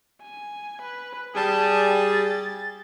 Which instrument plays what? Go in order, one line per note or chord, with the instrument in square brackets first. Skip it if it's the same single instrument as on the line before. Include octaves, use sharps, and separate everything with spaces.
[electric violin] G#5
B4
[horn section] G3 G#4 [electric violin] G#5 A5
[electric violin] A6